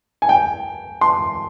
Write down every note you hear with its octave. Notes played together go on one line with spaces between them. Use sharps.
G#5
G5
C6